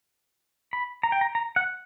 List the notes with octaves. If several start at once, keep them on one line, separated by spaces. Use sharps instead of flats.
B5
A#5
G5
A#5
A#5
F#5